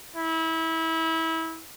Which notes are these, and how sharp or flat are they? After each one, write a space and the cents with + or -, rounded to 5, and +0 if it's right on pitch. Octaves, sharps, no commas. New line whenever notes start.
E4 -25